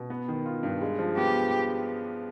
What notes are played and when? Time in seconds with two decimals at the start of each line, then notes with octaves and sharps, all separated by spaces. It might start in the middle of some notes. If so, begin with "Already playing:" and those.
Already playing: B2
0.10 B3
0.28 D#3
0.46 F4
0.63 G2
0.82 G#3
0.99 F3
1.17 B3 G4